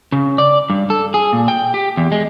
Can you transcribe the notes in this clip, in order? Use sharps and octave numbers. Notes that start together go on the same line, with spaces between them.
C#3
D5
G2
A4
G#4
A#2
G5
G4
E2
G#3